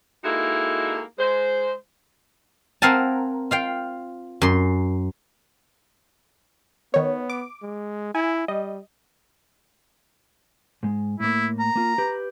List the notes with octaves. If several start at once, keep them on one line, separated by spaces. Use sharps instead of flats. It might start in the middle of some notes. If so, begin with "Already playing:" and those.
G#3 A#3 D#4 E4 F#4 A4
G#3 C5
C4 A#4 F5 F#5 G#5 A5
F4 F5 G5
F#2 C6
D#3 B3 C#5
D6
G#3
E4 G#5
G3 D#5
G#2 G#3
A2 A#3 E4
A#5
A#3 F4
G4 B4